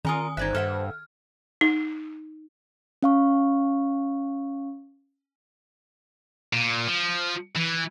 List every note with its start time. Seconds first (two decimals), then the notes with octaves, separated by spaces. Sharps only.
0.05 D#3 F4 A#4 G#5 A#5 D#6
0.37 G1 D#4 C5 D5 E5 F#6 G#6
0.55 G2 A4 E5 F#5 F6
1.61 D#4
3.02 C#4 F5 C#6
6.53 A#2
6.88 F3
7.56 E3